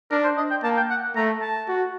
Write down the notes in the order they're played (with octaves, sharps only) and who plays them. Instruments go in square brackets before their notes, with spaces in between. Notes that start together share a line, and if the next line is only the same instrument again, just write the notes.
[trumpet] D4 [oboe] A#4
[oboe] C5
D#5
G5
[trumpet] A#3 [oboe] A5
[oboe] G5
F#5
[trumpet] A3 [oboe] A#5
[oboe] A5
[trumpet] F#4